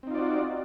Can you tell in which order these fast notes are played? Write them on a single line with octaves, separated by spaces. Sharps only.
C4 D#4 F4 D5 F#4